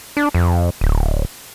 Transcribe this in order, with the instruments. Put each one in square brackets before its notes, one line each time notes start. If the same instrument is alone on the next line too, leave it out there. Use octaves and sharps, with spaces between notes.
[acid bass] D4
F2
D1